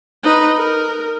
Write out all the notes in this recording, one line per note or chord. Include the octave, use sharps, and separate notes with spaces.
D#4 B4
A#4